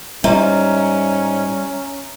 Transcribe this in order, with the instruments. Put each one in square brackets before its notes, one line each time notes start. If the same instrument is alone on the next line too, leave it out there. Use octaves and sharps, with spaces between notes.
[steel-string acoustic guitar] G#2 [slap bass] G3 [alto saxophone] C#4 [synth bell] E5 A#5